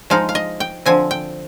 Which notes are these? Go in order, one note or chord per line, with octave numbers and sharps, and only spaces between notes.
F3 G#3 D#4 F5
F5
D#5
G5
D3 F3 C4 G#5
G5